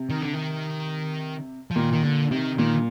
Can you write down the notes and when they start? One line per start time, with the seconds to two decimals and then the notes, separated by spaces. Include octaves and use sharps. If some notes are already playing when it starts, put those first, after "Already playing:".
Already playing: C3
0.10 D#3
0.22 D3
0.34 D#3
1.71 F3
1.75 A#2 D#3
1.93 D#3
2.03 A#2 D3
2.31 C3 D#3
2.58 A#2 D#3